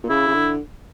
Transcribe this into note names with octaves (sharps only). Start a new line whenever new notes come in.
A#2
C#3 E4
C#3
D3